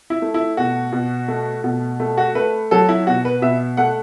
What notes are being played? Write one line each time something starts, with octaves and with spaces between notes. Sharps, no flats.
E4
A3
E4
B2 F#4
B2
A3
B2
A3
F#4
A3 B4
F#3 A4
E4
B2 F#4
B4
B2 E5
A3 F#5